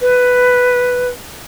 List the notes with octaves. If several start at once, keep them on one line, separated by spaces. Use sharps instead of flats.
B4